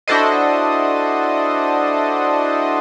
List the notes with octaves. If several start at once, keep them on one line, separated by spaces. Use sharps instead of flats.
D4 E4 F#4 A4 C5 D#5